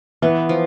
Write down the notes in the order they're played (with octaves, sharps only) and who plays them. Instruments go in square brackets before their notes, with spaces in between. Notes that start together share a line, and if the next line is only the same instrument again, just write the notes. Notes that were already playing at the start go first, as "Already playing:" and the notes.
[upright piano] E3 [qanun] B3
[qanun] F3